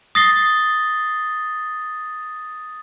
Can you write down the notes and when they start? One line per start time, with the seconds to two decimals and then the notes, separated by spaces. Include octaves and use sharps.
0.15 D#6 A6 A#6 C7 G7